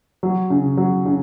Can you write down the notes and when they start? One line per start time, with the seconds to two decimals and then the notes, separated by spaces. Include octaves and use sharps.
0.23 F#3
0.50 C#3
0.77 F#3
1.06 C#3